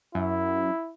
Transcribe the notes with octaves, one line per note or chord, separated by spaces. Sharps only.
F#2 E4